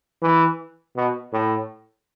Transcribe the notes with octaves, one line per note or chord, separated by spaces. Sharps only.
E3
B2
A2